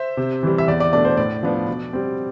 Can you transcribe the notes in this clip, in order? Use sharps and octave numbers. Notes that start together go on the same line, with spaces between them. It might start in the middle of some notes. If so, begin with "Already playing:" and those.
Already playing: C5 E5
C3
E3 G3
E5
E2 D5
D5
B2 A3 D4 D5
C5
A2 D5
F3 B3 D4
B2
G3 C4